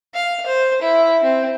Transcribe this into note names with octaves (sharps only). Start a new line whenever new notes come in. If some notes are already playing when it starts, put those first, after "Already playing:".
F5
C5
E4
C4